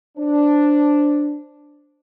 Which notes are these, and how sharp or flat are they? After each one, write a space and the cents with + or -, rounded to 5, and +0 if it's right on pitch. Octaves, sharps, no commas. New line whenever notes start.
D4 +0 C5 +0